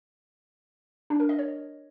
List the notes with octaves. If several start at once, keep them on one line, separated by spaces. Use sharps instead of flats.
D4
A#4
D#5
C#5